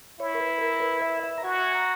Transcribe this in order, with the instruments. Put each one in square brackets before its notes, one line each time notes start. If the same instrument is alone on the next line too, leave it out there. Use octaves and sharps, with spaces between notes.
[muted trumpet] E4 [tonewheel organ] C#5
[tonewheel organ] A#4
B4
A#4
B4
E5
E5
A#5
[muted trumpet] F#4 [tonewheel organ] G#5
[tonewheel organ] A#5